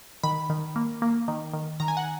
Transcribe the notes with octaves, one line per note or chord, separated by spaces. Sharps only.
D#3 B5
D#3
A#3
A#3
D#3
D#3
D#3 A#5
G#5
F#5